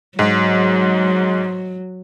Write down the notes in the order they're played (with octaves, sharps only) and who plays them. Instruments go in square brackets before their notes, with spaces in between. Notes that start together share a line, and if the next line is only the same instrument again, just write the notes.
[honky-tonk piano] G#2 [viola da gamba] F#3